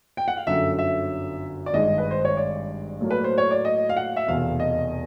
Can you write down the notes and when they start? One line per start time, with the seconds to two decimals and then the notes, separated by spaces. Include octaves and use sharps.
0.17 G5
0.28 F#5
0.37 F5
0.47 G1 F#2 D3 F#3 E5
0.79 E5
1.66 D5
1.73 G#1 G2 D#3 G#3 D#5
1.98 B4
2.11 C5
2.25 C#5
2.37 D5
3.01 A2 F#3 A#3
3.11 B4
3.24 C5
3.38 C#5
3.51 D5
3.65 D#5
3.89 F5
3.97 F#5
4.16 E5
4.28 F1 E2 B2 F5
4.60 D#5